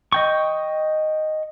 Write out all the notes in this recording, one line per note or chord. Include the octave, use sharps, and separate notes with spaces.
D#5 G5 C#6